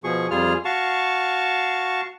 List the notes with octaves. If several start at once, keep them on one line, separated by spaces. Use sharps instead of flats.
B2 F3 G#4 C#6
F2 G3 F4 G#4 F6
F#4 F5 A5 C#6